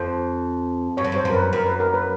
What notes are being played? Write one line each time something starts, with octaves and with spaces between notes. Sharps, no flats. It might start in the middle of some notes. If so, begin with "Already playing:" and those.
Already playing: F2 C5
G2 C#5
F#2
G2 C5
F#2
A#4
B4
F#2 A#4
B4
A#4
B4